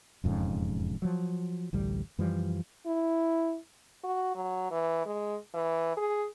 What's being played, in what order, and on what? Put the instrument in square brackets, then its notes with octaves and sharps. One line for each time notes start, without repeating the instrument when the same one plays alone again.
[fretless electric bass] E1 F2 G#2 C#3
F3 F#3
A1 D2 G3
F#2 E3 F3 G3
[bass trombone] E4
[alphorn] F#4
F#3
E3
G#3
E3
G#4